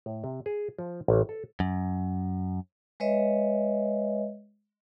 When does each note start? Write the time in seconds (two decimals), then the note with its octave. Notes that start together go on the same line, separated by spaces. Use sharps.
0.06 A2
0.24 C3
0.46 G#4
0.79 F3
1.08 A1
1.29 A4
1.60 F#2
3.00 G#3 B4 C#5 D#5 E5